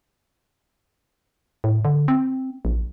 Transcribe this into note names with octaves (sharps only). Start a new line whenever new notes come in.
A2
D3
C4
A#1